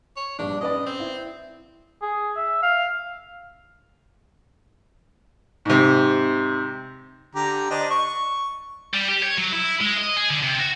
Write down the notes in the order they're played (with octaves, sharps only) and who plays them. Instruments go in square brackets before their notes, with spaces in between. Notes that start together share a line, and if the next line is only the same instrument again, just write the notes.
[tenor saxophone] C#5
[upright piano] A#1 G2 [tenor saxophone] D4
[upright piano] C#4 B4 D5 [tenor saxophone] D#5
[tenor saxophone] C4
[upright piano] E4
[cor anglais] G#4
E5
F5
[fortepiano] G#2 C3
[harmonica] D3 G4 A#5
D4 C5 D#5
C#6
[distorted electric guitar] G3
G4
C#5
F#3
E4
G#3
D#5
G#4
D3
C3
F#4